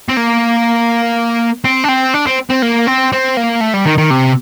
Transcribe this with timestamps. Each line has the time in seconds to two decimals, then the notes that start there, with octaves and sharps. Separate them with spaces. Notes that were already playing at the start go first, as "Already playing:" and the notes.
0.09 C4
0.17 A#3
1.64 C4
1.84 D4
1.88 C4
2.14 D4
2.27 C4
2.50 C4
2.63 A#3
2.87 C4
3.13 C4
3.37 A#3
3.61 A3
3.74 G3
3.86 D#3
3.98 D#3
4.10 C3